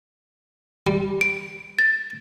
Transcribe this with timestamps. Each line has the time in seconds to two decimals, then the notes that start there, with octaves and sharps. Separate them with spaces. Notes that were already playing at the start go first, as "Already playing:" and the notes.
0.87 G3
1.21 D7
1.79 A6